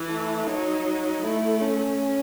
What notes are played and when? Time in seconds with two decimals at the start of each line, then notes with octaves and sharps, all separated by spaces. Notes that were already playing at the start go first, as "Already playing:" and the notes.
Already playing: E3
0.09 A3
0.47 F#3 D#4
1.22 A3 E4
1.61 C#4